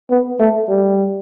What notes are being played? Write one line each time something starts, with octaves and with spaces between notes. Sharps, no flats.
B3
A3
G3